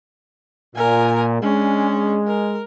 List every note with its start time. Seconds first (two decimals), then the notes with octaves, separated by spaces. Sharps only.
0.75 A#2 A#4 G#5
1.42 G#3 C#4 D4
2.27 A#4